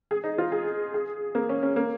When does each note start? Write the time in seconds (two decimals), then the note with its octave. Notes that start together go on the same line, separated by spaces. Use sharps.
0.11 G#4
0.24 D#4
0.38 F4
0.52 G#4
0.94 G#4
1.35 A#3
1.49 C#4
1.63 C#4
1.76 A#3